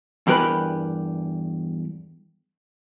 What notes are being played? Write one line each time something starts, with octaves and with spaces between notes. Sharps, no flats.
E2 G2 G4 A#4 B4 B5